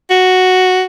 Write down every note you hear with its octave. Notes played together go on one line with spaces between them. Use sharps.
F#4